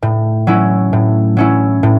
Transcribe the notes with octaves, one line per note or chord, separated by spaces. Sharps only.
A2
F#3 C#4 E4
A2
F#3 C#4 E4
A2